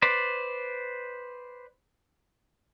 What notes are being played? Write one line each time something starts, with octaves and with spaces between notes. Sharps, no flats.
B4 C5 D5